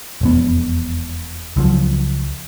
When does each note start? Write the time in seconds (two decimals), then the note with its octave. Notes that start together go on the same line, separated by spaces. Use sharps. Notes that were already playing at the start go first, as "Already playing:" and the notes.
0.21 E1 F2 B3
1.56 C#2 F3 F#3